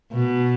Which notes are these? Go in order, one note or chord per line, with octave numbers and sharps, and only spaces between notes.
B2